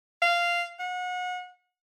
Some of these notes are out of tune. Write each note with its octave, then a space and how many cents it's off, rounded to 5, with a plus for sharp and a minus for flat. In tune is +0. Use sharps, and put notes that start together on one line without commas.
F5 -10
F#5 -30